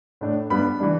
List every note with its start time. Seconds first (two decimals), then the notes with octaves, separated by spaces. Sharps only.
0.21 A2 A3 D4
0.50 G2 G3 B3 D4 B5
0.80 E3 G3 D4